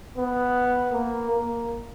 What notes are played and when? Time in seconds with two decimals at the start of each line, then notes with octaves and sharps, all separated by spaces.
0.18 B3
0.93 A#3
1.30 A#3